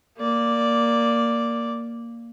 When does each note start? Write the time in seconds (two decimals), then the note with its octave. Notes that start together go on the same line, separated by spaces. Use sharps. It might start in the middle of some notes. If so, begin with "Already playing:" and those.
0.18 A#3 D5